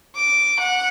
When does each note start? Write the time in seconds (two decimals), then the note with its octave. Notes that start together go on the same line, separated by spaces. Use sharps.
0.16 D6
0.59 F#5